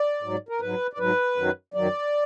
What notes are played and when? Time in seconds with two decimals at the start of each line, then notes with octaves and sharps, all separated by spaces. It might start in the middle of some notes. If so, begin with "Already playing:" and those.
Already playing: D5
0.23 G#2 F#3
0.49 A#4
0.60 G#2 F#3 B4
0.93 D5
0.98 G#2 F#3 B4
1.36 F#2 D#3 F#3
1.74 F#2 D#3 F#3 D5